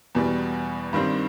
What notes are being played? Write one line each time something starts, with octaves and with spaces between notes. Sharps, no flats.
E2 B2 G3
G2 D#3 G3 C4